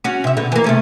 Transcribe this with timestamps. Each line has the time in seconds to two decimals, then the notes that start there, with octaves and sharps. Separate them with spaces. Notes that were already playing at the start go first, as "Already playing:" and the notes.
0.04 C#4 F#4
0.24 C3 E5
0.37 B2 D3
0.52 E3 A#3
0.64 C3 A3 C#4